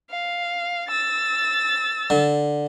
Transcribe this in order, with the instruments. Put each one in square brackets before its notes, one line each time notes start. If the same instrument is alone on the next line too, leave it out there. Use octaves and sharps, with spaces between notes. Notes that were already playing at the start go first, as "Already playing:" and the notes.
[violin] F5
E6 A6
[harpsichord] D3